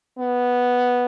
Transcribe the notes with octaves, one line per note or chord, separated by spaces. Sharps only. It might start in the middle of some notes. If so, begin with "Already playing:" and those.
B3